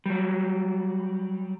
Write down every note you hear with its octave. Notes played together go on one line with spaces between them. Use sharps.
F#3 G3